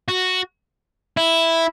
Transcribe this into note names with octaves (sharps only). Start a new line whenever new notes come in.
F#4
E4